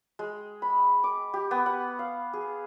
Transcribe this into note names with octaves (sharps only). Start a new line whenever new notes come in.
G#3
B5
D6
G4
B3
F#5
F5
G#4